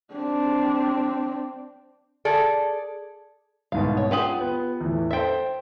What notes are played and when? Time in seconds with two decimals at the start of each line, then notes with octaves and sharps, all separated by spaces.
0.14 C4 D4
2.25 G#4 A4 D5
3.72 C2 G#2 B2 F5
3.97 C#5
4.11 F4 G4 G#4 F#5 F#7
4.41 B3
4.81 E2 A2
5.11 A4 C5 E5 G5